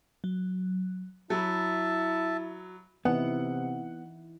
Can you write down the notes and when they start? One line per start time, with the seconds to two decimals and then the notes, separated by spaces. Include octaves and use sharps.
0.24 F#3
1.30 F#3 E4 E5 A5 B5
3.05 C3 E3 B3 D#4 E4 F#5